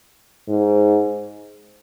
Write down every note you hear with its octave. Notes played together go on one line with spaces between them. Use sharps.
G#2